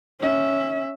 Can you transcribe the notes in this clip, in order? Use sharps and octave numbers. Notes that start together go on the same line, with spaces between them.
C#4 E5